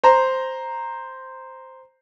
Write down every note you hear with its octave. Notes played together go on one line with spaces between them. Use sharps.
C5 A#5